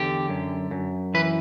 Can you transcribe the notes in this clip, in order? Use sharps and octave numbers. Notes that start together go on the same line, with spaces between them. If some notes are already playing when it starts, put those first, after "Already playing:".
Already playing: E2 D3 G4
F#2
F#2
E3 B4